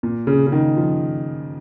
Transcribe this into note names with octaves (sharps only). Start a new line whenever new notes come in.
A#2
C#3
C#3
D#3
F3